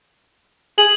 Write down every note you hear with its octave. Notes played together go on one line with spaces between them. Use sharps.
G#4 F#7